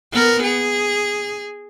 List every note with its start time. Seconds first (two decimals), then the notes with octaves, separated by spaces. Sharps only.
0.13 B3 A#4
0.43 G#4